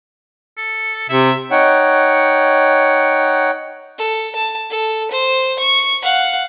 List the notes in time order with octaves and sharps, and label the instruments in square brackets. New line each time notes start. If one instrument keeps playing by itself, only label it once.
[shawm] A4
[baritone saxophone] C3 [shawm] E5
[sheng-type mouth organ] D#4 C#5 F#5 G5
[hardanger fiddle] A4
A5
A4
C5
C#6
F5 F#5